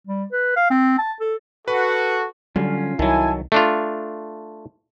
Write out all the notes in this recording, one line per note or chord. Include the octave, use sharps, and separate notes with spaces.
G3
B4
F5
C4
A5
A4
F#4 A4 B4
D3 F#3 G3 C#4 F4
C2 D#3 F#3 E4 A4 G#5
A3 D4 F4